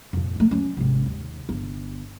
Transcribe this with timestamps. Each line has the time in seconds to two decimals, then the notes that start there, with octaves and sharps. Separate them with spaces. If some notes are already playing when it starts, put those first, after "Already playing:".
0.13 F2 A#2
0.36 G3 A3
0.51 F#3 C#4
0.77 G#1 C3
1.06 D#2
1.49 G1